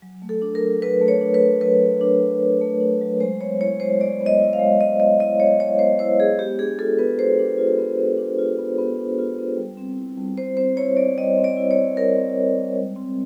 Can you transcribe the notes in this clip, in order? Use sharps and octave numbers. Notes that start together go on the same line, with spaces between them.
F#3
A3
A4
D4
A#4
F#3
F#3 B4
A3
C#5
D4
B4
F#3
F#3 B4
A3
D4
F#3
F#3
A3
D4
F#3
G#3 C5
B3 C#5
E4 C#5
G#3 C5
G#3 D5
B3
D#5
E4
F5
G#3
G#3 D#5
B3 D#5
E4 D#5
G#3 C#5
G#3 C#5
B3 C5
E4 C5
G#3 G#4
B3 G4
D4 G#4
F4 A4
B3 B4
B3 C5
D4
F4
B3
B3
D4
F4
B3
B3
D4
F4
B3
G3
C4
E4
G3
G3 C5
C4 C5
E4 C#5
G3 D5
G3 D#5
C4
D5
E4
C#5
G3
G3 A#4
C4
E4
G3
G#3
C4